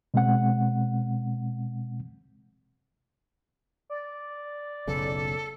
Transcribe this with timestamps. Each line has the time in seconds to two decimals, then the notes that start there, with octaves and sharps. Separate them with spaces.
0.14 B2 G#3 C4 F#5
3.90 D5
4.88 F#1 B1 C#3 A4